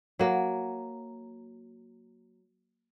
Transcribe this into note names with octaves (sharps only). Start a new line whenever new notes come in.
F#3 A#3